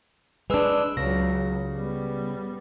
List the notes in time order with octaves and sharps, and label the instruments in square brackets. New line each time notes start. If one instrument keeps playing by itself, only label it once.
[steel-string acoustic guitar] G#3 D4 [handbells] B4 E6
[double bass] C#2 F#3 [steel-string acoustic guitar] C#3 [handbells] A#6
[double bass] G3 B3